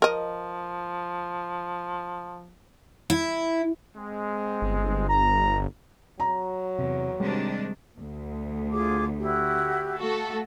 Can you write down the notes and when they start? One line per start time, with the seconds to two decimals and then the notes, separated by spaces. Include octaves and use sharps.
0.02 F3 A#4 D#5
3.10 E4
3.96 G#3 C4
4.62 G1
5.09 A#5
6.20 F#3 A#5
6.79 E2 C3
7.20 C3 D#3 G3 G#3 D4
7.98 D2
8.72 F4 G#4 D6
9.20 E4 F#4 G4
9.98 A3 F#4 A4 F5